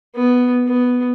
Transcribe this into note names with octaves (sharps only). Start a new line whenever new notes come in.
B3
B3